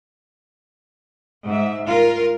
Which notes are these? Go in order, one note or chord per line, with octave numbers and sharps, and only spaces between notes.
G#2 E5
F4 A#4